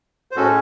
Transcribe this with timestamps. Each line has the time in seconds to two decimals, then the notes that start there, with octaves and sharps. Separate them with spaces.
0.31 C5
0.36 A2 G#3 C#4 F#4 A4